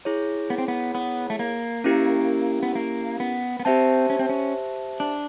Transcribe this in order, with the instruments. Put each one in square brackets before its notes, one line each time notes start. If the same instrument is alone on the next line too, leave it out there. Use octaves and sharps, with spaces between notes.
[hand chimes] E4 G#4 C#5
[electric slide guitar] B3
C4
B3
B3
A3
A#3
[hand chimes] C#4 E4 G4 A#4
[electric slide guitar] B3
A#3
B3
B3
[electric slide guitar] C4 [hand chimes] G4 C5 E5 A5
[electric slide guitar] C#4
C4
C#4
D4